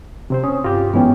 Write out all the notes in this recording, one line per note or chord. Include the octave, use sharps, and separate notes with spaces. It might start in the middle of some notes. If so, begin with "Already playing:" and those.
C3 C4 C5
C#4 D#6
G2 F4 G4
G#2 E3 B3 C#4 G5